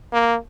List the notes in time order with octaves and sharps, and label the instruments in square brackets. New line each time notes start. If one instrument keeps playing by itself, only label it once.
[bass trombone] A#3